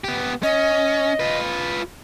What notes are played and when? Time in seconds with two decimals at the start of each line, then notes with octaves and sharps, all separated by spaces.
0.04 B3 G4
0.43 C#4 D#5
1.20 F4 B4